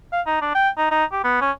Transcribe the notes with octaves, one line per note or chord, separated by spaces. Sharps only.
F5
D#4
D4
G5
D#4
D#4
G4
B3
C#4